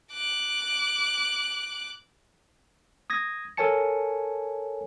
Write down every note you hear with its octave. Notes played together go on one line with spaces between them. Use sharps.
D6 F#6
D#6 G#6 A#6
A4 A#4 C#5 G#5 A5 C#7